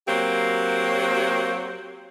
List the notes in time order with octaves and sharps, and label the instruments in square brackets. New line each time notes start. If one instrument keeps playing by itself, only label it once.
[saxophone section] F#3 A#3 C4 G4